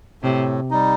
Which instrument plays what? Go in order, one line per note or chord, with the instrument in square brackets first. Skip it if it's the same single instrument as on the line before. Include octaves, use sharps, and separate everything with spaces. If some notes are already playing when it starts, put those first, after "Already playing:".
[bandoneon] A2 [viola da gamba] C3
[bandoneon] G3 D#4